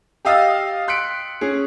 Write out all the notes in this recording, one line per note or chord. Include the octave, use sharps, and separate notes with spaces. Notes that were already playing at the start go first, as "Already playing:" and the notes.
G4 D#5 F5 D#6 E6 A6
C6 F#6 B6 C#7 D7
C#4 G#4